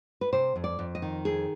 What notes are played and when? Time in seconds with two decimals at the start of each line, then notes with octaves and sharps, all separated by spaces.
0.21 B4
0.33 C3 C5
0.56 F2
0.64 D5
0.79 F2
0.95 D#5
1.02 D#3
1.25 F2 G#4